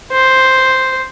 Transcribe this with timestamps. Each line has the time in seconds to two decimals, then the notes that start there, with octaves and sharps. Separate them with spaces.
0.12 C5